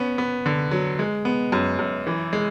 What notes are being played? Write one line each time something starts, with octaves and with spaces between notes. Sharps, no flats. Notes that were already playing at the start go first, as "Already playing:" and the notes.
Already playing: B3 C#4
B3
D3
F#3
G#3
B3
F#2
F#2
E3
G#3